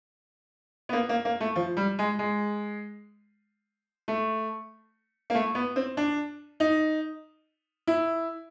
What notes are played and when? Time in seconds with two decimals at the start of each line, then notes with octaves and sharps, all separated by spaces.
0.89 B3
0.93 A#3
1.09 A#3
1.25 A#3
1.41 A3
1.56 F3
1.77 G3
1.99 G#3
2.19 G#3
4.08 A3
5.30 A#3
5.35 A3
5.55 B3
5.76 C4
5.97 D4
6.60 D#4
7.87 E4